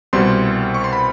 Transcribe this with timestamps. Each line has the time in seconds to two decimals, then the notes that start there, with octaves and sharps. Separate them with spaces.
0.13 C2 B2 G3 C4 C6
0.74 C#6
0.84 C6
0.93 B5